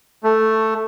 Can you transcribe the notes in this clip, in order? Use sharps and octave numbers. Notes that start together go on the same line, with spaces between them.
A3